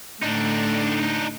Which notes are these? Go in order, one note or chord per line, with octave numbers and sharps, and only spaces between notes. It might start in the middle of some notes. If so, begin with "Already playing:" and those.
A2 D3 D4 D#4